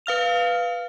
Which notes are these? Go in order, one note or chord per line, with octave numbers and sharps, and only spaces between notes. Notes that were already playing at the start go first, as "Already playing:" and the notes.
B4 F5 F6 F7